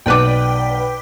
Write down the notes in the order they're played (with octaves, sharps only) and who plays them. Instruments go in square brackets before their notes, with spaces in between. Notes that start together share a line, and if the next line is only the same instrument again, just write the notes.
[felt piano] B1 D6 [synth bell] B4 D5 G5